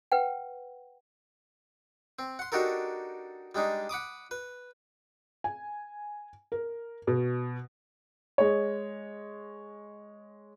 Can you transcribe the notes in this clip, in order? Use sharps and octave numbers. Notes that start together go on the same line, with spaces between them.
B4 F#5 G5
C4
F#5 C6
D4 D#4 F#4 G4 A4 A#4
G3 G#3 D4 D#4
F#5 B5 D6 D#6
B4
G#5
A#4
B2
G#3 C#5